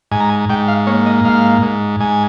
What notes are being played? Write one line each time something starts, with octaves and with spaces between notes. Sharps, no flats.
G#2 G#5
A#5
G#5
G#2 G5
F5
A#3 C#5
D#5
G#2 F5
G#2
G#2 G#5